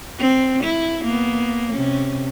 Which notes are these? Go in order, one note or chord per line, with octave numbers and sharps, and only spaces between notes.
C4
E4
A#3 B3
C3 C#4